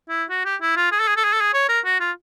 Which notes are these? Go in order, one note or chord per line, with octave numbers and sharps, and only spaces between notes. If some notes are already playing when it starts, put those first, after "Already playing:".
E4
F#4
G4
E4
F4
G#4
A4
G#4
A4
G#4
A4
G#4
C#5
A#4
F#4
F4